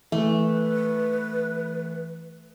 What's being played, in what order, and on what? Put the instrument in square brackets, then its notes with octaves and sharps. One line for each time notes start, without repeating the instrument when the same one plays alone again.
[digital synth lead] E3 [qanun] A3 [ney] B4